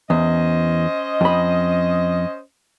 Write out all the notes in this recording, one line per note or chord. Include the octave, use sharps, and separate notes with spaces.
E2 C#4 C5 D#5
F2 B5